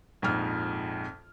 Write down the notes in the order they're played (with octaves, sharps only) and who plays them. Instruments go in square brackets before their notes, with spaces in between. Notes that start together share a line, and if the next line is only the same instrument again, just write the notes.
[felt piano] A#1 F2 G#2 F6